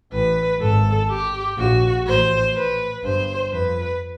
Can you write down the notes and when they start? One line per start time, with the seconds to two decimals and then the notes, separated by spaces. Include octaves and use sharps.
0.13 A1 A2 B4
0.61 G#1 G#2 A4
1.10 G4
1.58 A#1 A#2 F#4
2.07 A1 A2 C5
2.55 B4
3.04 G1 G2 C5
3.52 F2 B4